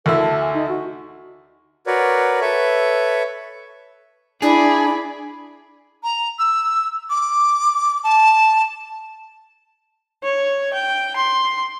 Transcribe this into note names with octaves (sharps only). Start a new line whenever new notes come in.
D2 D3 E4 A#4
A5
G#5
D#4
F#4
F#4 A#4 B4 C#5 D5
A4 B4 C#5 E5
D4 E4 G#4 D5 B5
A#5
E6
D6
A5
C#5
G5
C6